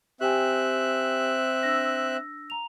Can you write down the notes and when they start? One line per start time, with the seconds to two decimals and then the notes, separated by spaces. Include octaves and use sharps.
0.21 C4 G4 E5 G5 G#5 F#6
1.63 D4 E6 A#6
2.50 A#5 F7